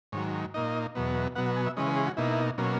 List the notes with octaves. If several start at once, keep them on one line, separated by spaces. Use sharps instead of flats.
G#2 D#3 F#3 C#5
A#2 A#3 D#4 D#5
E2 B2 F#3 B3
B2 F#3 B3 F#5
F#5
G#5
E5
C#3 E3 G#3 C#4 D#5
B4
G#4
F#4
B2 A#3 D#4 E4
B2 F#3 A#3 C#4